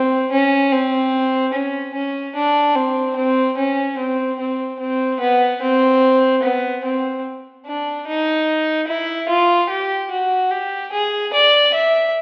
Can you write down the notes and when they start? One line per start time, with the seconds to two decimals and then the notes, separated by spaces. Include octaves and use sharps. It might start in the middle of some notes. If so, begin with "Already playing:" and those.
Already playing: C4
0.32 C#4
0.72 C4
1.54 C#4
1.95 C#4
2.36 D4
2.76 C4
3.16 C4
3.57 C#4
3.99 C4
4.40 C4
4.80 C4
5.21 B3
5.62 C4
6.43 B3
6.85 C4
7.67 D4
8.07 D#4
8.88 E4
9.29 F4
9.70 G4
10.12 F#4
10.51 G4
10.93 G#4
11.34 D5
11.74 E5